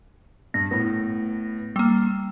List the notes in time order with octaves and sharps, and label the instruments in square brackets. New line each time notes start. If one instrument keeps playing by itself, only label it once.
[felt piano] G2 [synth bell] A#6
[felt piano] A2 B3
[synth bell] G3 A#3 [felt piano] E6